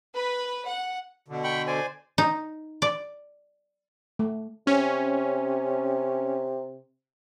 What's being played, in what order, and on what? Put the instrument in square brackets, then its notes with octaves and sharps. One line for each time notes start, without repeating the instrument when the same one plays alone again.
[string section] B4
F#5
[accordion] B2 D3
[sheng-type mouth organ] G5 B5 C#6
C5 D5 G#5
[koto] D#4
D5
[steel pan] A3
[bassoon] C3 [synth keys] C#4